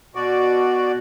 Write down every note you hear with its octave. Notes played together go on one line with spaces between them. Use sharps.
B2 F#4 D5